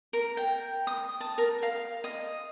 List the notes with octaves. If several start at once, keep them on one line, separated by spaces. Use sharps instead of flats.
A#4
G5
D#6
A5
A#4
F5
D#5